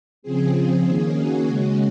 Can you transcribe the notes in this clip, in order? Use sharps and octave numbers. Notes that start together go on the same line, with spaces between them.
C#3 F3 C4 G#4
D#3 A#3 C#4 G#4
F#4
C#3 G#3 C#4